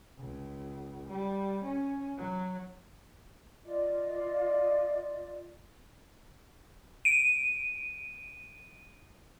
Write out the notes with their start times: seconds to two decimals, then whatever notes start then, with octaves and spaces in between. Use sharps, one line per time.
0.18 C#2
1.10 G3
1.65 C#4
2.18 F#3
3.65 F4 D5 D#5
7.05 D7 D#7